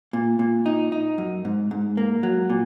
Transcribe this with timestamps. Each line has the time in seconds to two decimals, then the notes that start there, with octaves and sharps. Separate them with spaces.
0.13 A#2
0.39 A#2
0.66 D#4
0.92 D#4
1.18 F#2
1.45 G#2
1.71 G#2
1.97 A#3
2.23 F#3
2.50 A#2